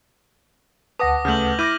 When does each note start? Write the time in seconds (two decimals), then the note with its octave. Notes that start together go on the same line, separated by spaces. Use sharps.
0.99 D2 B4 F#5 A5 D6 D#6 A#6
1.25 C#3 A3 F6 G6 F#7
1.59 E4 D6 F6 G6 A#6 D#7